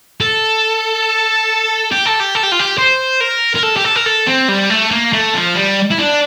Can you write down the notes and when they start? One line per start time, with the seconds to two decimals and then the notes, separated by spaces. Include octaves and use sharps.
0.21 A4
1.92 G4
2.06 A4
2.20 G4
2.35 A4
2.43 G4
2.52 F4
2.59 G4
2.78 C5
3.21 A#4
3.56 A#4
3.63 A4
3.76 G4
3.84 A4
3.95 A#4
4.06 A4
4.27 C4
4.48 G3
4.70 A3
4.91 A#3
5.13 A3
5.34 F3
5.55 G3
5.90 E4
5.98 D4